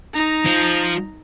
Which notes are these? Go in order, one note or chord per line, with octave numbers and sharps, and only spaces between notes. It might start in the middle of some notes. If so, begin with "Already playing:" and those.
D#4 A#5
F3